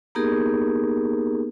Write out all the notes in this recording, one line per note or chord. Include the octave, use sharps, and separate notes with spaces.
A#3 B3 D#4 G4 G#4 A#4